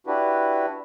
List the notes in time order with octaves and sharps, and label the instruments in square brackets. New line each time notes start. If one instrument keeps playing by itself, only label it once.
[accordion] D4 E4 F#4 G4 B4